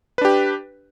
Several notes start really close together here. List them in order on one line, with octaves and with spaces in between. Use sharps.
B4 D4 G4